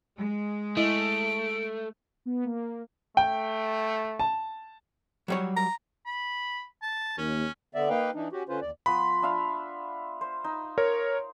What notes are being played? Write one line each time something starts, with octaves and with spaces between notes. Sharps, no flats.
G#3
A3 E4 D#5 D7
B3
A#3
A3 G5
A5
F#3 G3 C#5
A#5
B5
A5
D#2 C#4
D3 B3 D5 E5
A#3 D#4 B4 F5 G5
E3 D4 D#4
C#4 F#4 G4
D3 C#4 F4 B4 C5
D#2 D5
F3 B3 B5 C6
D4 E5 F5
C5
D#4
A#4 C#5